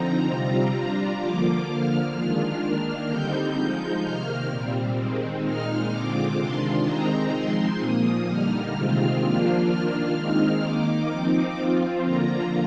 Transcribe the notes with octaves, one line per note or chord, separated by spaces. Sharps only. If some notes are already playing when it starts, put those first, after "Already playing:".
Already playing: D3 F3 C4 D#4 A#5
C3 G3 C4 F4
G3 D4 F4 A#5
D3 F3 A#3 F4 D6
D3 F3 A#3 F6
D#3 G#3 D4 F4
D#3 A#3 D4 F6
D3 G3 C4 D#4 G6
F3 G#3 D#4
C3 D#3 A#3 F6
A#2 G3 C4
D#3 G#3 C4
A#2 G#3 D#4 F6
D3 G#3 C4 F4 D6
C3 D#3 G#3 D4 F4 C6
D#3 G#3 C4 D#4 A#5
F3 G#3 C4 D#4 C6
A#2 F3 A#3 D#6
D3 G3 A#3 D#4 F6
C3 D#3 G#3 C4 F4 F6
F3 A#3 D4 F4
D#3 A#3 D4 F4 F6
D#3 G#3 C4 D#4
D#3 A#3 D#4 D6
F3 C4 D#4
F3 C4 F4
D3 F3 A#3 F4 A#5